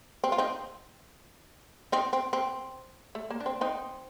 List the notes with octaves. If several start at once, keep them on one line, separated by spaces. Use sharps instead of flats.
C4
F4
C4 D#4
C4 D#4
C4
C4
A3
A#3
D4
C4
C4 D#4